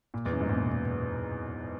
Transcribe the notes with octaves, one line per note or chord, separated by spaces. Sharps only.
A#2
E2
F#2
G#2
A#2
B2
A#2